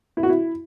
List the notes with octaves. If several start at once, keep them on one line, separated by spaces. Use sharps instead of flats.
E4
F#4
E4